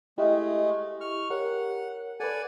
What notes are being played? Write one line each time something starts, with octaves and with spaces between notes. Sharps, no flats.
G#3 A3 E4 G4 D#5
C#6 F6
G4 A#4 C#5 F#5
A4 B4 D5 F#5 G#5